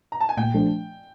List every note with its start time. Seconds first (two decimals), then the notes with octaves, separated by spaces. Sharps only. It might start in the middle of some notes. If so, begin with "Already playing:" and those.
0.12 A#5
0.21 A5
0.29 G#5
0.37 A#2 G5
0.54 F3 A3 D4